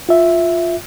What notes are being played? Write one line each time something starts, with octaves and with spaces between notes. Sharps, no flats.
F4 E5